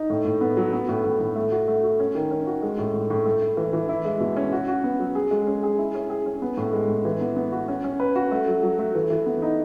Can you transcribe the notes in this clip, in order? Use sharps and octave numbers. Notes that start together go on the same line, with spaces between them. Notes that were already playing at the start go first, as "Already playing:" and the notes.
Already playing: D#4
A2
A2
B3
F#3
B3
A2
A2
A2
A3
F#4
A3
F#4
C#4
D#3
C#4
F#4
G#3
A2
A2
A2
A3
E4
E3
E3
E4
G#3
B2
C#4
F#4
F#4
B3
F#3
G#4
G#3
C#4
G#4
E4
C#4
G#4
C#4
B3
A2
G#3
A2
E3
B3
B3
F#4
C#4
C#4
B4
F#4
A3
F#3
F#3
A3
E3
E3
B3
D#4